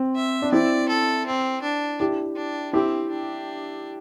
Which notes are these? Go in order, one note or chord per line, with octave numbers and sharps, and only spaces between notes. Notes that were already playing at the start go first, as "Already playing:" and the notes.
Already playing: C4
E5
D4
C4 E4 D5
A4
C4
D4
E4 G4
D4
C4 E4 G4
D4